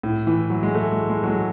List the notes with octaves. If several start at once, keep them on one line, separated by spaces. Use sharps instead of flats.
A2
E3
F#3
G#3
A3
G#3
G#3
F#3
G#3